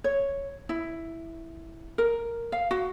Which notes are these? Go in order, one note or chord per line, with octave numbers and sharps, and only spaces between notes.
C#5
E4
A#4
F5
F#4